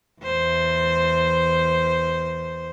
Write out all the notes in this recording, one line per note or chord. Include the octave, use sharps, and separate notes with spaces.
E2 C5